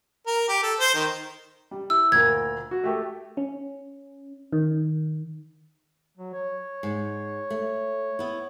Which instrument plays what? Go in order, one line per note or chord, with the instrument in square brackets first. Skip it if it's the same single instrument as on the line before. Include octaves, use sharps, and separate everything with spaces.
[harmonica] A#4
G4
A4
C5
D#3
[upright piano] G3
[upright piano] E4 [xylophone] E6
[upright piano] D2 A#2 A#4 [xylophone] G#6
[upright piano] F#4
A3 G4 A4
[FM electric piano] C#4
D#3
[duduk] F#3
C#5
[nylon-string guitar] G#2
A3
B3 E4